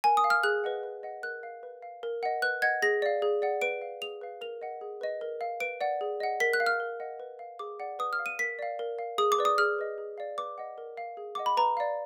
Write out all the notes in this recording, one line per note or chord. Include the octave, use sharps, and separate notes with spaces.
A#4 G#5
D#6
F5
F6
G#4 F#6
B4 D#5 F#5
B4
D#5 F#5
A#4 F#6
F5
B4
F5
A#4
D#5 F#5
B4 F#6
D#5 F#5 G#6
G#4 A#6
D5 F5
G#4
D5 F#5
B4 D7
F5
G#4 F7
B4 F5
A#4 F7
D#5 F#5
G#4
B4 D#5
A#4
F5
B4 D7
D5 F#5
G#4
D#5 F#5
A#4 B6
F#6
F5
F6
A#4
D#5 F#5
B4
F5
G#4 D6
D5 F#5
B4 D#6
F6
F5
D#7
A#4 B6
D5 F5
A#4
F5
G#4 D#6
D6
B4 D5
D#6
G#4 F6
B4 D#5
G#4
D5 F5
B4 D6
D#5 F#5
A#4
F5
G#4
D#5 F#5 D6
B5
B4 A#5
D5 F5